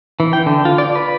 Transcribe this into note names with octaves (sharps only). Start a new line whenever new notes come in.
E3
G5
D3
F4
D5
B4